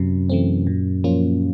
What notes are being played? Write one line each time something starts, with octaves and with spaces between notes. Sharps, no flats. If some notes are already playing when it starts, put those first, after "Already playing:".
Already playing: F#2 C3
E3 A3 C4
A#2
F3 A#3 C#4 F4